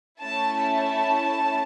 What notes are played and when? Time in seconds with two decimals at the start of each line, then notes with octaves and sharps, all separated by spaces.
0.20 A3 C#4 E4 A5
0.56 A5